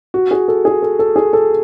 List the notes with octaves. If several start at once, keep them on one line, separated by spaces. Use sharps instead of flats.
F#4
G#4
A4
G#4
A4
A4
G#4
A4